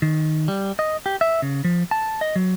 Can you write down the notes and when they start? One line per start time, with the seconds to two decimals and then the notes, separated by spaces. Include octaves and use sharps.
0.02 D#3
0.48 G3
0.79 D#5
1.06 G4
1.21 E5
1.42 C#3
1.64 F3
1.91 A5
2.21 D#5
2.36 F#3